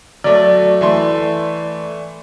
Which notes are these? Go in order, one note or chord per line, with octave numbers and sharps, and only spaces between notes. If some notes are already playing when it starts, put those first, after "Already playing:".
F#3 A3 D5
E3 A3 C6